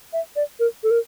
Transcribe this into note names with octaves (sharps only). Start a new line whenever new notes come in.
E5
D5
A#4
A4
A#4